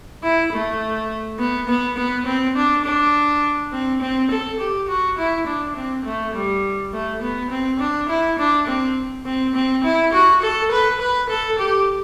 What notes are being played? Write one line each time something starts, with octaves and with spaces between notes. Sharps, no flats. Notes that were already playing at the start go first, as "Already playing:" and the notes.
E4
A3
B3
B3
B3
C4
D4
D4
C4
C4
A4
G4
F#4
E4
D4
C4
A3
G3
A3
B3
C4
D4
E4
D4
C4
C4
C4
E4
F#4
A4
B4
B4
A4
G4